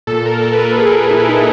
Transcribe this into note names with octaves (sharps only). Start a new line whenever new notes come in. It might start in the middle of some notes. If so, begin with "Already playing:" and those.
A#2 A4
A#4
A4
B4
A#4
A#2 G#4
E4
D#4